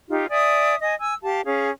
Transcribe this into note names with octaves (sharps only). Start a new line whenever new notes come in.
D#4 F4 G4
D5 E5 G#5 D#6
D#5 G#5
G#5 E6
G4 F5 A5
C#4 G#4 F5